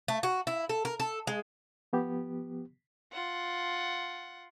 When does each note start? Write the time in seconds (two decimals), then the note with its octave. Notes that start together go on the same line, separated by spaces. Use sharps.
0.08 A3
0.23 F#4
0.47 E4
0.69 A4
0.85 A#4
1.00 A4
1.27 G#3
1.93 F3 B3 G4
3.13 F4 F#5